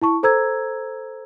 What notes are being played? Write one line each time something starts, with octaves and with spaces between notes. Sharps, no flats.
E4 A5 C#6
A4 C5 A#5 E6 G#6